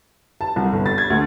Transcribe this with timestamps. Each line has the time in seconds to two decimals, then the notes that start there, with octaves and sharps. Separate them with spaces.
0.41 A5
0.56 C2
0.72 G1
0.86 A6
0.98 G#6
1.10 D2